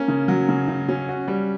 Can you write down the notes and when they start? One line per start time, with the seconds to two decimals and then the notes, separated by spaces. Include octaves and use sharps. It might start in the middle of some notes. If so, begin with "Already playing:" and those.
Already playing: A#3 C#4
0.08 C#3
0.28 F#3
0.49 C#3
0.68 C#3
0.89 C#4
1.08 F#4
1.28 G3